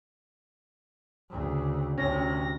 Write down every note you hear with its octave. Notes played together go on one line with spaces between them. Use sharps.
D2 C#3
D2 C3 C#4 A#6